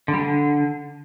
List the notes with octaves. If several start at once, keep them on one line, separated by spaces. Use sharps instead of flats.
D3
G3
D3